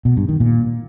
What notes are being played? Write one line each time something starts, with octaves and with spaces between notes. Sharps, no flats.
B2
G2
D#3
A#2